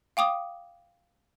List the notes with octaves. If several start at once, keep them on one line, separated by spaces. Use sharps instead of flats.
F5 G5 D6 D#6